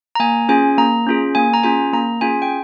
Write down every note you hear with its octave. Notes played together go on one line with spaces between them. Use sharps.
A#5
A#3 G#5
C#4 F4 G#4 G#5
A#3 A#5
C#4 F4 G#4
A#3 G#5
A#5
C#4 F4 G#4 G#5
A#3 A#5
C#4 F4 G#4 G#5
G5